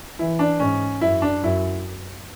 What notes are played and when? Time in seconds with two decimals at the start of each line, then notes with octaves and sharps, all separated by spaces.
0.19 E3 E4
0.39 D4
0.60 G#2 C#4
1.01 F#2 E4
1.22 D4
1.43 F#2 E4